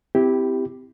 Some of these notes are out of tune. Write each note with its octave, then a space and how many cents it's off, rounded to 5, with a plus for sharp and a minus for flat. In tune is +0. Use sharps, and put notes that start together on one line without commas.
C4 -25 E4 +0 G4 +0